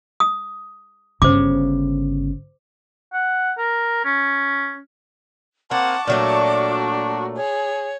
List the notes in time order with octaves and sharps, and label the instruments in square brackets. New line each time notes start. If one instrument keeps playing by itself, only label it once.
[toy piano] D#6
[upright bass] G1 C#3 [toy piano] C5 D6
[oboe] F#5
A#4
C#4
[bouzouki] A#3 [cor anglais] C4 [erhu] F#5 [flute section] A5 C#6 D6
[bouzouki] A#2 F#3 A3 [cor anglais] D4 [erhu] F#4
[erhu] G#4 [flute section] C#5